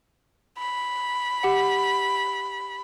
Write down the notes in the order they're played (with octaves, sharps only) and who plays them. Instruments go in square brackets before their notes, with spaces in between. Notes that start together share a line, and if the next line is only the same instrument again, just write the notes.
[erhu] B5
[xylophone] G4 F#5